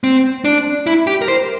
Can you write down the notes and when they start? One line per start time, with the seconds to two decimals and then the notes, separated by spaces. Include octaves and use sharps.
0.04 C4
0.45 D4
0.86 E4
1.07 G4
1.22 A#4
1.28 C5